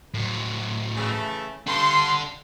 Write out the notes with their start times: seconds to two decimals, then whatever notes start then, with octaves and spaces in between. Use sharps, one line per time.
0.14 A2 F#3
0.95 C#3 E3 A3
1.67 G2 D4 A4 C6